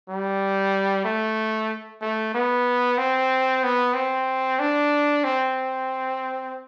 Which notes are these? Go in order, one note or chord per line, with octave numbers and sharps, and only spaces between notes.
G3
A3
A3
B3
C4
B3
C4
D4
C4